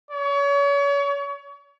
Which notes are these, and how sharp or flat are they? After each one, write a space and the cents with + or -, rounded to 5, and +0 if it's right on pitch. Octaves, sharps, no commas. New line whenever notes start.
C#5 +35